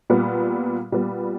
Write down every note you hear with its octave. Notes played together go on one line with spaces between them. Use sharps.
A#2 G3 B3
A#2 G3 B3